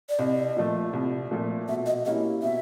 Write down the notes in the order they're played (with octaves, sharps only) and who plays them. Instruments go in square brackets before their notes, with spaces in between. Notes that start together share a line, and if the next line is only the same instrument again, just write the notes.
[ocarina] D5
[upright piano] C2 [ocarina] D#5
[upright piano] A#2 F3 A3
C2
A#2 F3 A3
[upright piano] B2 [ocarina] E5
[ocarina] D#5
[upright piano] G3 A#3 C#4 E4 [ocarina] D#5
[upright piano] B2 [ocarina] E5